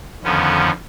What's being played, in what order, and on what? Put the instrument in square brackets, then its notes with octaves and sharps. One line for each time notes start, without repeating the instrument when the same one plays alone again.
[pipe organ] F2 D3 D#3 F3 B3 C#4